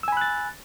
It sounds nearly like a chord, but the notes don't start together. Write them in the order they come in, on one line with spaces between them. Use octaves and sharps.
E6 G#5 B5 F#6 A6